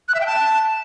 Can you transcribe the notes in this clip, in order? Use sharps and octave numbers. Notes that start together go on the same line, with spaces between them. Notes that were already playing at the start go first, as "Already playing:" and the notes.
F#6
E5
G5
A5